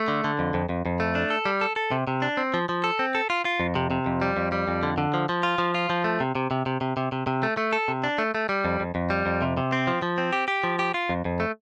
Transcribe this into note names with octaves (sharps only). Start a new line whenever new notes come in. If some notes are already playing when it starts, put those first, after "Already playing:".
Already playing: A3
D3
D3
F2
F2
F2
F2
A3
D4
A4
G3
A4
A4
C3
C3
D4
C4
F3
F3
A4
C4
A4
F4
F4
F2
C3
C3
F2
G3
F2
G3
F2
D3
D3
F3
F3
F4
F3
F4
F3
A3
C3
C3
C3
C3
C3
C3
C3
C3
A3
A3
A4
C3
D4
A3
A3
G3
F2
F2
F2
G3
F2
C3
C3
C4
F3
F3
C4
G4
G4
F3
G4
F4
F2
F2
A3